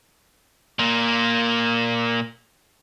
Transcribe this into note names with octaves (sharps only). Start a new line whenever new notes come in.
A#2 A#3